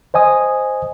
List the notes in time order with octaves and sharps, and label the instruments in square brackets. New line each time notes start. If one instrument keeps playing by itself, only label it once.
[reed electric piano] C5 D#5 G#5 D#6